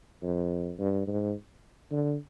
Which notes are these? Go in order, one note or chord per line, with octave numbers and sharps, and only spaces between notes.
F2
G2
G#2
D3